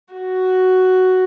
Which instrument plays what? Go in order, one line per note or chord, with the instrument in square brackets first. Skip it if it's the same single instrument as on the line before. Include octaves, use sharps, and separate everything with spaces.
[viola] F#4